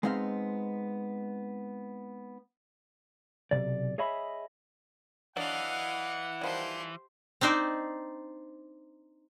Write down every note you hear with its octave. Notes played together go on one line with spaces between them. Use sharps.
G#3 B3 C4 D#4 F5
B1 E2 C3 D5
G#4 C#5 D#5 E5 B5
E3 F#3 D4 D#5 F5 F#5
D#3 F3 G3 G4 C5
C4 D4 D#4 C5 D5